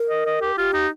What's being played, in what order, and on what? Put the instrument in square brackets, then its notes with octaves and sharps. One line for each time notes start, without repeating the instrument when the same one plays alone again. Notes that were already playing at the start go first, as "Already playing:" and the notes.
Already playing: [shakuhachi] A#4
[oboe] D#5
D#5
G4
[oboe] F4 [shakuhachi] G4
[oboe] D#4